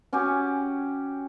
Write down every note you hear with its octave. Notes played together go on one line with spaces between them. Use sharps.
C#4 F#4 G4 G#5